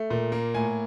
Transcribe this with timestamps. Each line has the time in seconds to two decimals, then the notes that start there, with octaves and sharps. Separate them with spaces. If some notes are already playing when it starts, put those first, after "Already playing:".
Already playing: A3
0.10 A#2
0.32 A#3
0.54 A2 G#5